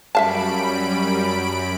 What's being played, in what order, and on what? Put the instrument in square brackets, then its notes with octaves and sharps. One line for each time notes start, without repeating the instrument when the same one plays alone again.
[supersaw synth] F#2 B5 D7 [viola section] G3 C#4 [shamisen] E5 F5 A5